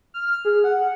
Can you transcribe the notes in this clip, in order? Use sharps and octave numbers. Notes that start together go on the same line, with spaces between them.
F6
G#4
F#5